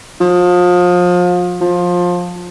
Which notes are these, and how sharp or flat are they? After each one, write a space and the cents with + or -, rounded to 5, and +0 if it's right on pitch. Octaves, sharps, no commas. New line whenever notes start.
F3 +30
F3 +20